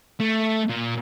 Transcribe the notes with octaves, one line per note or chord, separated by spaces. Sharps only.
A3
A#2